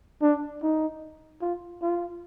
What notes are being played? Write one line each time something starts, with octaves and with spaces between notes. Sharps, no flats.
D4
D#4
F4
F4